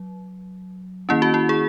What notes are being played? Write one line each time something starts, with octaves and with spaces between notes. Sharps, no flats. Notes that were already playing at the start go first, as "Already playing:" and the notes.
Already playing: F#3
D#3 A#3 C#4 E4
F#4
E4
G#4